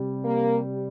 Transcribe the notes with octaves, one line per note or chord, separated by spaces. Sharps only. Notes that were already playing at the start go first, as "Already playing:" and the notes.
Already playing: C3 G3
A#3